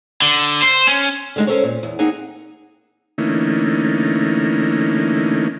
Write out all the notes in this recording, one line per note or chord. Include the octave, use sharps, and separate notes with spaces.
D3
C5
C#4
D3 G#3 D#4
C#4 A4 A#4 C5 C#5
A#2
E2
A#3 C4 D#4 G#4 F#5 G#5
D3 E3 A3 A#3 C#4 D#4